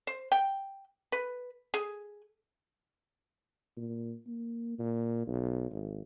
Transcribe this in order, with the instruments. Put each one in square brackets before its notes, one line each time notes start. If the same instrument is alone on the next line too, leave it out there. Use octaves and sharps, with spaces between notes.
[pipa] C5
G5
B4
G#4
[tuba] A#2
A#3
A#2
B1
G#1